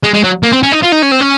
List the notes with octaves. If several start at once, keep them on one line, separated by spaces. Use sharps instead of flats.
G#3
G#3
F#3
A#3
C4
C#4
D#4
F4
D#4
C#4
C4
C#4